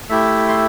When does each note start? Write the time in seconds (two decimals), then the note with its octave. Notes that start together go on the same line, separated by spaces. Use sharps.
0.09 A3 E4 G4 E5
0.49 C6